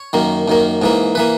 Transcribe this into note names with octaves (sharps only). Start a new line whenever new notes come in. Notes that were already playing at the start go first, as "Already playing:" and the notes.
Already playing: C#5
F#2 D#3 A#3
F#2 D#3 A#3
G#2 E3 A#3
E3 A#3 B4